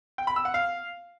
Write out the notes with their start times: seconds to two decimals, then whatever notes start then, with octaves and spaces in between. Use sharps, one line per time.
0.18 G5
0.27 B5
0.36 E6
0.45 F#5
0.54 F5